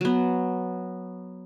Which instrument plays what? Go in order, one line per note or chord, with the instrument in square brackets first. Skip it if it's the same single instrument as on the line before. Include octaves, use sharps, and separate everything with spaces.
[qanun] F#3 B3